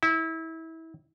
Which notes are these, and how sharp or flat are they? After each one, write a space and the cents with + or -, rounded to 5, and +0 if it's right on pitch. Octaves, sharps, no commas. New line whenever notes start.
E4 -25